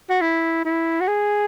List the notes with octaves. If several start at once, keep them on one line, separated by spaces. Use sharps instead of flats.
F#4
E4
E4
F#4
G#4